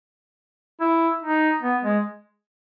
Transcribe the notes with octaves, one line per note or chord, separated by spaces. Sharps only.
E4
D#4
B3
G#3